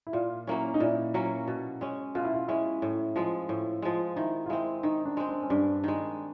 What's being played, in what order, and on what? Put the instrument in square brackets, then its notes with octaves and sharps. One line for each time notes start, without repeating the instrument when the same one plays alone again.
[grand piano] E4
[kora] A#2 [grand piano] F4
[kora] F#3 A#3 C#4 [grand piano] E4
[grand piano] D#4
[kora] A#2 [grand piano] E4
[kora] F#3 A#3 C#4
B2
G#3 C#4
[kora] B2 [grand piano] F4
[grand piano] E4
F4
[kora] G#3 C#4 [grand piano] E4
[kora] A2
F3 G#3
A2
F3 G#3
[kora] D#3 [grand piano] E4
[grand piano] F4
[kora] G#3 C4 [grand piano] E4
[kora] D#3 [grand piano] D#4
[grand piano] D4
[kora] G#3 C4
[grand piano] D4
C#4
[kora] G2 [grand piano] D4
[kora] D#3 G#3